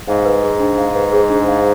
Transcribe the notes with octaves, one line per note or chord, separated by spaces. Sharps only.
G#2 F5
B4
G#4
D4
F5
B4
G#4
D4
F5